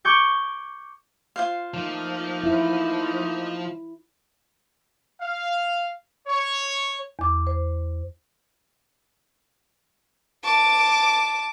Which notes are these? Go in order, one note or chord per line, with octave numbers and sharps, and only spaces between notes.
C#6 D6 G6 G#6 C#7
F4 C5 F5
F3 A3 A#3 D#4
E4
F5
C#5
E2 D6
C5
A5 D6